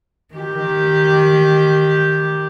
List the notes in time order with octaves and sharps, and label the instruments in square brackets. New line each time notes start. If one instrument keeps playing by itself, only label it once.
[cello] D#3 G4